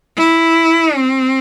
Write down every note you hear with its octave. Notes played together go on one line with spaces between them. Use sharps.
E4
C4